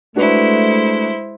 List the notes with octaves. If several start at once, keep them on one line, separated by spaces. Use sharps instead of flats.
G#3 A3 D4 E4 F#4 B4 C5